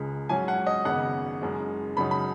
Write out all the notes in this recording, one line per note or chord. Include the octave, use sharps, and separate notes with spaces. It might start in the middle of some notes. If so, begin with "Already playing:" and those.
Already playing: C#2 C#3 G#3
G#2 F#3 C#4 G#5
F#5
D#5
G#1 F#2 C#3 B3 F#5
F#1 F#2 C#3 G#3
F#2 C#3 F#3 D#4 B5
B5